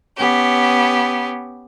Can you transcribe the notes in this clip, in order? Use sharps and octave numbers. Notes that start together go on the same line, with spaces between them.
B3 C#4 G4